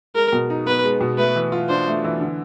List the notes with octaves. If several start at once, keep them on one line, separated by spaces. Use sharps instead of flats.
G#3 A#4
B2
D#4
B3 B4
G#3
B2
A3 B4
E3
F4
D4 C5
A3
E3
D3